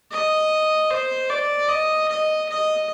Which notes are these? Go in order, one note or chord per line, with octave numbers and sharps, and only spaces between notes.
D#5
C5
D5
D#5
D#5
D#5